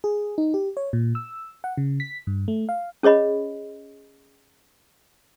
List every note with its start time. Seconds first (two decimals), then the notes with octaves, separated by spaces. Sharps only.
0.04 G#4
0.38 D#4
0.54 G4
0.77 C#5
0.93 A#2
1.15 E6
1.64 F#5
1.77 C#3
2.00 B6
2.27 G2
2.48 A3
2.69 F5
3.03 C#4 G#4 C#5 D#5 B5